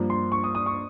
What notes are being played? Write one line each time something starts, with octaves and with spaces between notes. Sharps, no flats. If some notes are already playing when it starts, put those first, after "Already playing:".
Already playing: G2 F3 A#3
C6
C#6
D#6
D#6
C#6